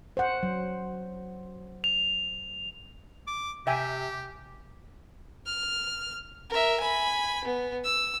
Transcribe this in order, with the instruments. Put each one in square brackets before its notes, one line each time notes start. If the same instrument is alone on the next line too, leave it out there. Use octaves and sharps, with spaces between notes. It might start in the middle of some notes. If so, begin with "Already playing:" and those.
[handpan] C5 F#5
F#3
[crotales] F7
[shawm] D6
[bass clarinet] C3 [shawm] G4 [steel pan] E5 G5 G#5
[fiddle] F6
A#4 E5
G#5 B5
B3
E6